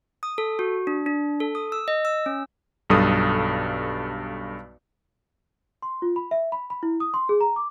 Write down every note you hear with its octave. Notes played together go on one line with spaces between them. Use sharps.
D#6
A4
F#4
D4
D4
A4
D#6
E6
D#5
E6
C#4
B1 G2 A4 D#6
C6
F4
B5
E5
B5
B5
E4
D#6
C6
G#4
A#5
D6